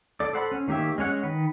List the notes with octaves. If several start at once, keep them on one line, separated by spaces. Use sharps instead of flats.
A4 D5
A4 C5 F#5 B5
C#4
D#3 A#3 G4 C#5 E5
G#3 C#4 C#5 F#5
D#3 B4